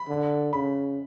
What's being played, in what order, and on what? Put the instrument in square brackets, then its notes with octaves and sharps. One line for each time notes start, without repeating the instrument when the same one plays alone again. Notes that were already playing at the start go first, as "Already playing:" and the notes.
Already playing: [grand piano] B5
[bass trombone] D3
[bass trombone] C#3 [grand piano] B5